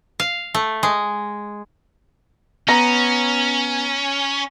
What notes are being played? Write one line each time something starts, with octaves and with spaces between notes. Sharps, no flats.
F5
A3
G#3
B3 C#4 A#5